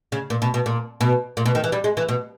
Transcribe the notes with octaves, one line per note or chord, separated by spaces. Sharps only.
C#3
A#2
B2
B2
A#2
B2
A#2
B2
D#3
E3
G3
G#3
E3
B2